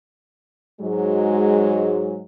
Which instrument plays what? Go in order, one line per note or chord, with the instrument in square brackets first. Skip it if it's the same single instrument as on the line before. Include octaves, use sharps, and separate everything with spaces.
[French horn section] G#2 F#3 G#3